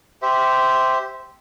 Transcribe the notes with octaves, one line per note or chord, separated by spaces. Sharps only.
G4 C5 E5